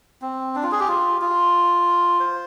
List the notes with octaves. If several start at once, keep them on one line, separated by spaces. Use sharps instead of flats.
C4
D4
F4
G#4
G4
F4
F4
C5